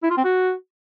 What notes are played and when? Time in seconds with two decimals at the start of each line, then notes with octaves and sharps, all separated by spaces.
0.03 E4
0.10 F4
0.17 C4
0.24 F#4